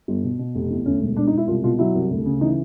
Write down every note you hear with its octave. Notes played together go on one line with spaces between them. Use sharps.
G1
B2
B2
F1
E2
D2 C#4
E1
E1 D4
D#4
E1
E4
C2 F4
B2 F4
F#3 E4
C2
D2
C#3
E3 D#4